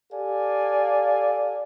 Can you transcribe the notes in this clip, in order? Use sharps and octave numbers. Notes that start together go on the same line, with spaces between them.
G4 A4 D5 F5 G#5